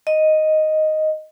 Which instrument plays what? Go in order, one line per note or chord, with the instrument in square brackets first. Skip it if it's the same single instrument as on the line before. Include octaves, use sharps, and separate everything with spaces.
[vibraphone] D#5